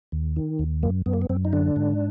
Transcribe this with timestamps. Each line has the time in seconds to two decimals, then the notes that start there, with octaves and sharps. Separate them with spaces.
0.12 D#2
0.36 D#3
0.59 D#2
0.83 F#2 A#3
1.06 F#2 B3
1.13 A#3
1.22 B3
1.29 F#2 C4
1.45 D#4
1.53 D3 D4
1.76 G#2